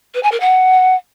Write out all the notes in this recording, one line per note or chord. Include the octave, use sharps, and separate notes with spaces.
B4
G#5
A#4
F#5